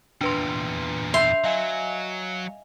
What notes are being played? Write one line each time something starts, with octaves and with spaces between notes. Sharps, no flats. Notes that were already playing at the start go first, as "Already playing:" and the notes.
E2 A#2 D4 B4 C6
E5 C6 G6 C7 F7
F#3 D#5 F5 G#5